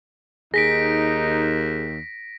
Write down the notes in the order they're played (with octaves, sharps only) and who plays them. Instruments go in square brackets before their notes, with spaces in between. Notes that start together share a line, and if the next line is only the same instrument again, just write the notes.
[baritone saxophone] D#2 [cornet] D#4 [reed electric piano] G#4 [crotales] A#6 B6 D7